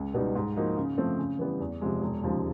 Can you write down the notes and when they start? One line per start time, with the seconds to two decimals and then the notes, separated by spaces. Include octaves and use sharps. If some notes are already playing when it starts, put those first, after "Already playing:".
Already playing: C#2
0.14 B2 G3 B3 D#4
0.35 G#2
0.56 F3 A#3 D#4 F#4
0.77 C#3
0.97 F3 A3 C4
1.18 C#3
1.39 E3 G3 B3
1.60 E2
1.81 C3 F3 G#3
2.01 E1
2.22 D#2 C#3 F3 G#3